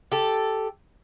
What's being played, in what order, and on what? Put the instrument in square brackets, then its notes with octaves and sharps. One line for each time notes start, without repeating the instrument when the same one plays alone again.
[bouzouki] G4 A4